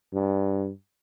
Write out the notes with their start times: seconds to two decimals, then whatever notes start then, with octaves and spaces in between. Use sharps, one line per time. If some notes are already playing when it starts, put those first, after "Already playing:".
0.13 G2